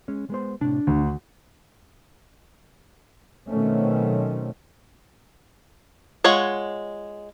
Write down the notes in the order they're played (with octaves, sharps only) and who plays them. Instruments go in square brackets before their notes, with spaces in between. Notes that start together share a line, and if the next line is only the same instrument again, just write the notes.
[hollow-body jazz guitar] G#3 C#4
G#3 B3 C5
[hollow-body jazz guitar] A2 C3 [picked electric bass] D4
[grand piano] D2 [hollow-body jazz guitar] D3
[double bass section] B2 D#3 F#3 A3 C4 C#4
[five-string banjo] G#3 F4 C#5 F#5